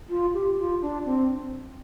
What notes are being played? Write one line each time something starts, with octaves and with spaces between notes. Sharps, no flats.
F4
G4
F4
D4
C4